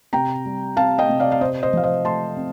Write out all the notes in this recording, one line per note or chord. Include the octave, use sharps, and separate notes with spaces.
C3 G5 A#5
G3
C4 F5 A5
D#5 G5
C3
D5 F5
F5
C3 C5 D#5
C5 D#5
F3 F5
C5 D#5
A3 A5 C6
C4